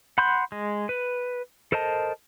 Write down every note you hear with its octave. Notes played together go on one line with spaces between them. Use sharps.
F#5 B5 C6 G6
G#3
B4
A4 A#4 C5 D#5 A5